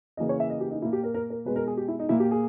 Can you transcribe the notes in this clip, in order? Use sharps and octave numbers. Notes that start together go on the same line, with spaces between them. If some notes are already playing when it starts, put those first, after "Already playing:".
C#3 E3 A#3 D#5
C#5
E5
D#5
G4
D#4
A#2 A#3 E4
G4
A#4
A#4
A#4
B2 G#3 B4
A#4
G#4
G4
E4
D#4
A#2 A#3 E4
G4
G#4